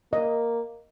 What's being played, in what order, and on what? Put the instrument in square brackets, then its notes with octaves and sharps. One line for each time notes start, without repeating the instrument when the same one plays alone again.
[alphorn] A#3 [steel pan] D#5